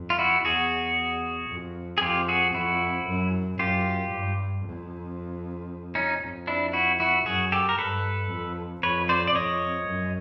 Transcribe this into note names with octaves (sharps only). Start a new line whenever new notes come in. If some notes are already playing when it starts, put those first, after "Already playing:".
Already playing: F2
F4
E4 F#4
E2 F#4 G#4
F2
G#4
F2 F4 G4
F#4 G#4
F2 E4 F#4
F#2
F#2 F4 G4
G2
F2
C#4 D#4
F2
D4 E4
E4 F#4
E4 F#4
F#2 F#4 G#4
G4 A4
A#4
G2 A4 B4
F2
F2 B4 C#5
C5 D5
D5
F2 C#5 D#5
F#2